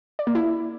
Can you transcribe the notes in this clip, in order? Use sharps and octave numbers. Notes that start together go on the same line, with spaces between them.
D5
A#3
E4